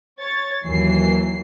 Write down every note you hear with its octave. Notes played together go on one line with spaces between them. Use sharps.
C#5 A6
D#2 E3 F#3 C7